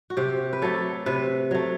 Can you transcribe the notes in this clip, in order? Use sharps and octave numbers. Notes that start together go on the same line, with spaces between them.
F#4
C3 G4
B4
F#3 A3 A4
C3 B4
F#3 A3